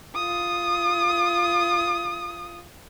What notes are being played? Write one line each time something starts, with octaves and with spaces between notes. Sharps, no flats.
F4 D#6